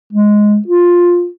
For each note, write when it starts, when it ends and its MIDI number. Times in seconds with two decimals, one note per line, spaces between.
0.13 0.57 56
0.68 1.28 65